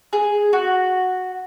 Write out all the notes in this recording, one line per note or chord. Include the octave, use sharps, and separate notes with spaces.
G#4
F#4